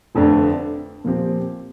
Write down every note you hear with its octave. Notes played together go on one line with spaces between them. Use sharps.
F1 F2 D3 A3 D4
A#2 F3 C4 G4